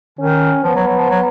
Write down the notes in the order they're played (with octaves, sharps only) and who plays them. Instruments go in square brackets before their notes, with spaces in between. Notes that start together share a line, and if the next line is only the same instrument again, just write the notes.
[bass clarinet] D#3 [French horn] C#4
[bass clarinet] F3 [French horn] B3
[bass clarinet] F#3
F#3
F3
F#3